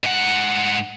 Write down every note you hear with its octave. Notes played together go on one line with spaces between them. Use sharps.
G#2 F#5